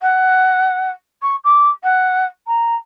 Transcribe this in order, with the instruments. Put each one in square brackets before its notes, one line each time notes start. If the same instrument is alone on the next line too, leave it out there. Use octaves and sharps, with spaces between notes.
[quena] F#5
C#6
D6
F#5
A#5